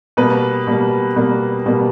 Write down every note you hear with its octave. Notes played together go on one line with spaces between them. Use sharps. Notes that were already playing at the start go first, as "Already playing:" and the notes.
B2 G3 A#3 B4
B2 G3 A#3
B2 G3 A#3
B2 G3 A#3